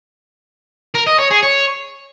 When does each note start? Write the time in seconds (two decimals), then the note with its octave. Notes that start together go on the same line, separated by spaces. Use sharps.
0.95 A#4
1.07 D#5
1.19 C#5
1.31 G#4
1.43 C#5